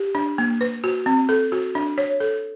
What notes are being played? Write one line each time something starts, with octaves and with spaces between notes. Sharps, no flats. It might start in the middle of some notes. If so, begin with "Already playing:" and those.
Already playing: G4
D4
A#3
B4
F#4
C4
A4
F#4
D4
C#5
A4